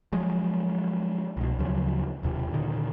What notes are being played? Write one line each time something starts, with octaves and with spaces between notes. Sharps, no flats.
F3 F#3 G#3
C2 B2
D2 C#3 F3 F#3
E1 D#2 C3
A#2 D3 D#3